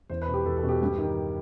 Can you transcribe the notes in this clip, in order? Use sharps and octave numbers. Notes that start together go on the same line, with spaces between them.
E2 C5
B4
B2
G4
E2 A4
A4
B2
G4
G2
D#3